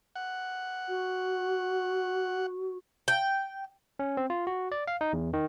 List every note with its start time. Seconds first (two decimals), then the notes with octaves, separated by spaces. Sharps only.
0.16 F#5
0.89 F#4
3.08 G5
3.99 C#4
4.17 C4
4.30 F4
4.47 F#4
4.72 D5
4.87 F5
5.01 D#4
5.13 E2
5.33 D#3